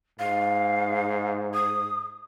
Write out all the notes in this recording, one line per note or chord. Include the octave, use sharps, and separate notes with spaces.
G#2 F5
D#6